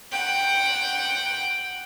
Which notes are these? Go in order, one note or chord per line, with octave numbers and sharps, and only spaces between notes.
F#5 G5